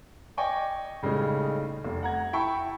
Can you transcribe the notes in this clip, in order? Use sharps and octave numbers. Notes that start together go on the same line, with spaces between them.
D5 D#5 G5 G#5 C#6 D6
A2 C#3 G3 G#3 D#4 A4
F1
F#5 A#5 G#6
E4 E5 G5 A5 B5 C#6